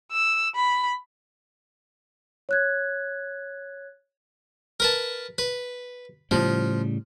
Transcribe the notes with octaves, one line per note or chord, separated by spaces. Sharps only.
E6
B5
C#5 F#6 G#6
A#4 B4 A5
B4
A2 C#3 F3 G3